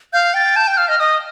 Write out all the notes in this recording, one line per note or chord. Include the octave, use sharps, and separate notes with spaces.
F5 G6
G5 A6
A5 G6
G5 G6
F5 F6
D#5 F6
D#5 D#6